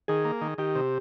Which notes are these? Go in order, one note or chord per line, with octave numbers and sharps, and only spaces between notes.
D#3 G#4
A#3
D#3
D#3 G4
C3